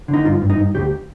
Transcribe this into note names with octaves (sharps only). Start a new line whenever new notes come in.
D3
D#4
G2 F4
G2
D#4
G2
D2 G4